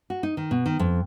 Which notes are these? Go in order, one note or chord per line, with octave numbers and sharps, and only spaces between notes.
F#4
D#4
D#3
B2
D#3
F2